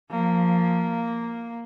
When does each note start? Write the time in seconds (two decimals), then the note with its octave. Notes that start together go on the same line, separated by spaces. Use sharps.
0.11 F3 A#3